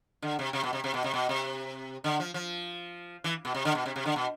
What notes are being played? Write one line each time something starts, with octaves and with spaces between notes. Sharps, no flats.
D3
C3
C3
B2
C3
C3
B2
C3
B2
C3
D3
F3
F3
E3
B2
C3
D3
B2
C3
C3
D3
B2